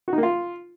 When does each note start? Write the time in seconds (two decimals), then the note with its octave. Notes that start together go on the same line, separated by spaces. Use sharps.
0.08 F#4
0.13 D#4
0.18 A#3
0.23 F4